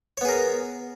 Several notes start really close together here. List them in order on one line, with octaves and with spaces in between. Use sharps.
C#5 B3 G#4 A#4